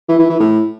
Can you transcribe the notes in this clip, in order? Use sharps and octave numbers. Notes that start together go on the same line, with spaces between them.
E3
E3
E3
A2